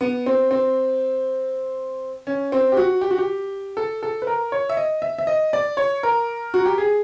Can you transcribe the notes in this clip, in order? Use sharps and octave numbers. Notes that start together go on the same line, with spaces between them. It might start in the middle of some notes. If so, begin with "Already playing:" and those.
B3
C4
C4
C#4
C4
G4
F#4
G4
F#4
G4
A4
A4
B4
A#4
C#5
E5
D#5
E5
E5
D#5
D5
C#5
A#4
F#4
G4
G#4